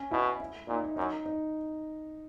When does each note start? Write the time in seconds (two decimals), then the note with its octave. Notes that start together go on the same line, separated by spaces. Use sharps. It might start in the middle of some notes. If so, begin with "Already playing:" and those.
Already playing: C#4
0.11 B2 E4
0.41 E4
0.68 A#2 D#4
0.83 D#4
0.96 F#2 D#4
1.26 D#4